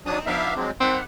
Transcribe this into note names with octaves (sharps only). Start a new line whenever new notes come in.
F#3 C4 D4 D#4 D#6
F3 B3 D4 D#4 E5 F5
F#3 G#3 C4
D#3 G3 C4 F#5